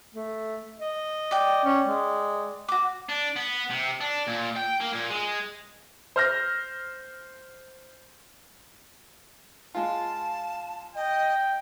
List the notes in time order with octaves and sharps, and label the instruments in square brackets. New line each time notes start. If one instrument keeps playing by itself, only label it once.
[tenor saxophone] A3
D#5
[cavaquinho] D5 G5
[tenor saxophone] C#4
G#3
[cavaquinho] F#4 D6
[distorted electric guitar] D4
B3
C3
D4
A#2
G5
A#3
A#2
G#3
[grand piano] C5 F6 A#6
[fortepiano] G#3 F4 [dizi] A5
[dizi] D#5 [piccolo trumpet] G5